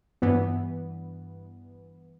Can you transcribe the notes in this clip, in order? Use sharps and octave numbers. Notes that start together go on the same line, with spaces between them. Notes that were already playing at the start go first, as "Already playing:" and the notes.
G2 E3 B3